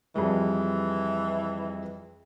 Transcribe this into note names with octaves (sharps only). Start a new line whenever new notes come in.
F2 E3 G3 G#3